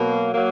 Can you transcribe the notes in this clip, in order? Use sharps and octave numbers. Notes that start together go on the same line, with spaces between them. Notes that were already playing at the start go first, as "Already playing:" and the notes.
Already playing: B2 F#3 A#3
F#3 A#3